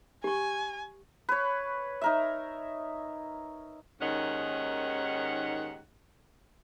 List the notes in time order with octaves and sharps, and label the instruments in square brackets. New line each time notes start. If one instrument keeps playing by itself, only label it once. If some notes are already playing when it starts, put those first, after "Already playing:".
[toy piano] G4 C#6 [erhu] G#5
[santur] B4 C#5
D#4 A#4 E5
[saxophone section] D#2 G#2 D#3 C#4 F#5